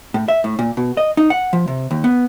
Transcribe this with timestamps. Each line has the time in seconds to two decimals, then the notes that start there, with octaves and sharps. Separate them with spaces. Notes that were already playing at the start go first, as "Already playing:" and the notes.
0.14 A2
0.28 E5
0.44 A2
0.59 A#2
0.77 B2
0.97 D#5
1.17 D#4
1.30 F#5
1.53 F3
1.68 C3
1.91 D#2
2.04 B3